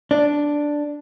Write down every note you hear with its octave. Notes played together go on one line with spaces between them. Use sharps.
D4